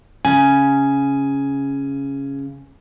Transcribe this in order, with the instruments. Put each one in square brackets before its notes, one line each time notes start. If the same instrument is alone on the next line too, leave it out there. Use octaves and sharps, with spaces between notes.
[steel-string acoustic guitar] C#3 [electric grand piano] G#5